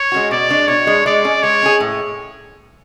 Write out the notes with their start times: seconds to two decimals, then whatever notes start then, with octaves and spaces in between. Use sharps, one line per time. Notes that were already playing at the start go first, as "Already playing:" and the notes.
Already playing: C#5
0.12 G#3 C#4 F#4
0.31 B2 D5
0.49 G#3 D4
0.68 B2 C#5
0.87 G#3 D4
1.06 G#3 D5
1.24 C#4 G#4
1.43 G#3 C#5
1.62 C#4 G#4
1.80 A2